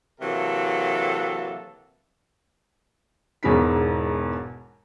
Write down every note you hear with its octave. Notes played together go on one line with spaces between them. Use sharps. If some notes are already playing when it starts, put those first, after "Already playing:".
C3 E3 F#3 A#3 A4
E1 E2 G#2 G#3 B5 B6